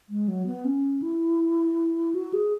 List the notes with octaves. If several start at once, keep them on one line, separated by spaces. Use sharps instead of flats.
G#3
F#3
B3
C#4
E4
F#4
G#4